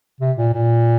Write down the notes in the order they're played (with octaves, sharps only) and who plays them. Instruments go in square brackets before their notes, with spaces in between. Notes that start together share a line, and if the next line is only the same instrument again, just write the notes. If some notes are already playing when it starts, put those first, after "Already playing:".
[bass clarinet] C3
A#2
A#2